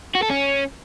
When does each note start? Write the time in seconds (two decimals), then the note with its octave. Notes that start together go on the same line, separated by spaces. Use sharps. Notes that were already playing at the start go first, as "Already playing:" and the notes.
0.15 F#4
0.22 A4
0.30 C#4